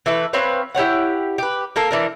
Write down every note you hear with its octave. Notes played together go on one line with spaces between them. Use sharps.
E3 A3 B4
C4 B4 C#5 F5
E4 G4 C#5 F#5
G4 B4
A#3 A4 A#4
E3 D4 A#4